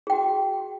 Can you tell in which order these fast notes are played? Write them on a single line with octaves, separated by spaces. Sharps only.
G#4 G5 F#4